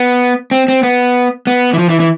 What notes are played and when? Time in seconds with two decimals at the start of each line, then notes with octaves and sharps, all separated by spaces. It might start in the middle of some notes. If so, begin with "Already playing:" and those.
Already playing: B3
0.51 C4
0.68 C4
0.83 B3
1.47 B3
1.73 E3
1.79 F3
1.90 E3
2.00 E3